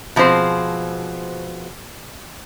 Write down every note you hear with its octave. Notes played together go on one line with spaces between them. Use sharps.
B2 F3 G#3 C4 C5